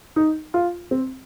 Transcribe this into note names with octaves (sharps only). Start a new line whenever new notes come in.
D#4
F4
C4